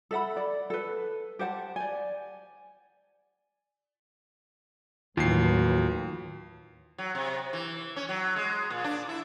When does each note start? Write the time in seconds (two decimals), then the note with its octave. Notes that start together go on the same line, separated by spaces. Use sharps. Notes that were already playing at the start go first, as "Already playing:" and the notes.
0.11 A4 E5 F#5 B5
0.37 D5
0.70 A4 B4
1.39 G4 C5 F#5 A5
1.76 D5 G#5
5.17 D#2 A2 E3 F#3 F4 F#4 C7
6.98 F#3
7.15 C3
7.53 E3
7.96 C#4
8.09 F#3
8.36 G#3
8.70 A#2
8.84 D4
9.09 E4